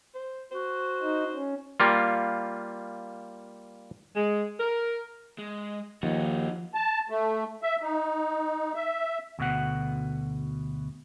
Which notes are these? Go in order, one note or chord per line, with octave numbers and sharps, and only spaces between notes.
C5
F#4 C5
D#4
C#4
G3 A#3 F4
G#3
A#4
G#3
D#2 F3 D#4 F#4
A5
A3
E5
D#4
E5
D2 B2 F#5